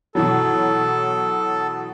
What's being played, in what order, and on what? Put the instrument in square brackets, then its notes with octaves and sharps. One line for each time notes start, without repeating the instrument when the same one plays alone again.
[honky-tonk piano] B2 E3 F#3 [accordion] A4